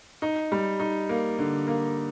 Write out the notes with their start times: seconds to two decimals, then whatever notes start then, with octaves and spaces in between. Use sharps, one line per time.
0.22 D#4
0.52 G3
0.80 D#4
1.09 A#3
1.39 D3
1.67 A#3